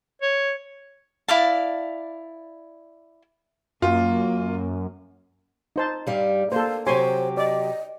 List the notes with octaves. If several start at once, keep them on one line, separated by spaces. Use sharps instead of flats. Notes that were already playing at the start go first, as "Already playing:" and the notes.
C#5
E4 D5 F5 A5
F#2 A#3 F4
D#4 C5 A5
G2 G3 F5
A#3 A4 C5 F5
C3 F#3 G4 C5 C#5 G#5 C6
D5 D#5